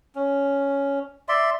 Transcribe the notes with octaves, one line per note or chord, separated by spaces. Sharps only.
C#4
D5 E5 C6